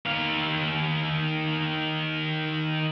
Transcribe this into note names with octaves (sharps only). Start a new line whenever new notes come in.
D#3 F5